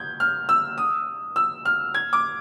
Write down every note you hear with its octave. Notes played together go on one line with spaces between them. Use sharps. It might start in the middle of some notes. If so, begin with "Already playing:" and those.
Already playing: G6 G#6
F6
E6
D#6
E6
F6
G#6
D6